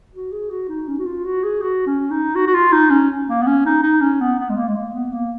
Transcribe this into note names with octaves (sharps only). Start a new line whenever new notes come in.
F#4
G#4
F#4
D#4
C#4
F#4
F4
F#4
G#4
F#4
C#4
D#4
F#4
F#4
F4
D#4
C#4
A#3
B3
C#4
D#4
D#4
C#4
B3
B3
G#3
A#3
G#3
A#3
B3
A#3